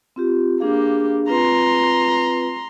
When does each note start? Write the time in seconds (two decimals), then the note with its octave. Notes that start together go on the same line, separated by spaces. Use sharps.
0.16 C4 F4 G4
0.60 A#3 D4 G4 G#4 F5
1.29 C4 F4 B4 A#5 C6